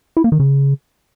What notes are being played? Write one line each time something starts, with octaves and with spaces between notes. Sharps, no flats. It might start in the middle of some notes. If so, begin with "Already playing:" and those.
E4
A#3
D#3
C#3